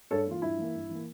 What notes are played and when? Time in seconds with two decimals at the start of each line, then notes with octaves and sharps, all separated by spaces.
0.11 G2 A4 C#5
0.27 E3 A#3 F4
0.42 G2 E4
0.58 E3 A#3
0.75 G2
0.89 E3
0.95 A#3